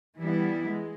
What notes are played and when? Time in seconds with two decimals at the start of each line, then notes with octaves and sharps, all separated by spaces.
0.18 E3 G3 B3 E4
0.66 G#3